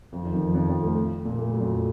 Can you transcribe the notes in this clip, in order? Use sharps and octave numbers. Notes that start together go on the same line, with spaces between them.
F2 F3
D#3
F2 F3
D#3
F2 F3
F2 F3
A2 A3
A#2 A#3
A2 A3
F#3
F2 F3